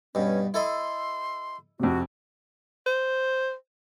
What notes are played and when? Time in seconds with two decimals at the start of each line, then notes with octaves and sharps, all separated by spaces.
0.15 G2 B2 C#4
0.54 E4 A4 D#5 C6
1.80 F2 C3 F#4
2.87 C5